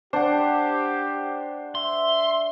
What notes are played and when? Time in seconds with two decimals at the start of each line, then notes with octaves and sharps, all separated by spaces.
0.13 D4 G4 C5 F#5
1.75 E5 C6